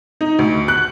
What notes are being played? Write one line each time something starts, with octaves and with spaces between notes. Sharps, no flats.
D#4
D2
F#6